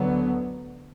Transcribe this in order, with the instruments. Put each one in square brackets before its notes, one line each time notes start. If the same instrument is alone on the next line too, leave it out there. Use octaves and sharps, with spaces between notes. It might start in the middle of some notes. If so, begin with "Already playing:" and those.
Already playing: [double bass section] D2 D3 F#3 B3